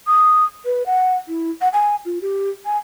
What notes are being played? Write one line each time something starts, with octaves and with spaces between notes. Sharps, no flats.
D#6
B4
F#5
E4
F#5
G#5
F4
G4
G#5